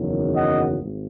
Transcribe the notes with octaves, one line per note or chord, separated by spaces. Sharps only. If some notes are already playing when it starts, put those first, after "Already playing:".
Already playing: F#1 E2 D#3 F#3 C#4
D#5 F#5
G#1